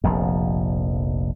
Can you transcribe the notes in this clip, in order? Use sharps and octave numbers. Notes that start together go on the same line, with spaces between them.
F1 A#1 F2